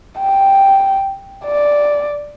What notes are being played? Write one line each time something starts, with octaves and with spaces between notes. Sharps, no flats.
G5
D5